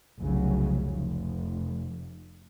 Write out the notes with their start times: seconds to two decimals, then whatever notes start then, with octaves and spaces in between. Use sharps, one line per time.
0.19 F1 C2 C#3 F#3
0.92 F1